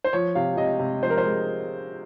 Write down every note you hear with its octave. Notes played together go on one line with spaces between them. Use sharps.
C5
F3 C#5
C3 F5
C3 D#5
C3
F3 C5
A#4
C5
G#3